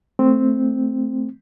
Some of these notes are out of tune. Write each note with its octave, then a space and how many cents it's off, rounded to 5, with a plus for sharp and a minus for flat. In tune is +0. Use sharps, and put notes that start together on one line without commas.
A3 +5 C4 +0